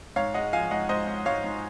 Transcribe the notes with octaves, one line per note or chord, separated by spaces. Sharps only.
G#2 C#5 F5
G#3 D#5 F#5
F3 F5 G#5
G#2 D#5 F#5
G#2 C5 D#5
G#2
G#2 C#5 F5
G#2